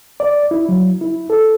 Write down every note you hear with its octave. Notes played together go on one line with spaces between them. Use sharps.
D5
E4
F#3
E4
A4